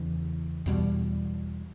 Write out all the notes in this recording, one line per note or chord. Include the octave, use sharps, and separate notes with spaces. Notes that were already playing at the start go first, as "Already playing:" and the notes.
Already playing: E2 C#3 E3
E2 B2 G3